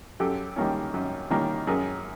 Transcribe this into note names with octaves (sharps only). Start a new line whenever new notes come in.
F#2 G4 A4
D#3 G3 A#3 C#4
F#2
D#3 G3 A#3 C#4
F#2 G#4 A#4